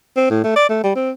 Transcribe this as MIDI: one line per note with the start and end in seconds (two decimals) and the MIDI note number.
0.17 0.26 60
0.30 0.42 45
0.44 0.51 57
0.56 0.69 74
0.70 0.79 57
0.84 0.92 55
0.96 1.11 60